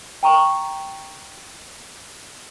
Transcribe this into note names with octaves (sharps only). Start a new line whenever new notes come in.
G5 A#5 C#6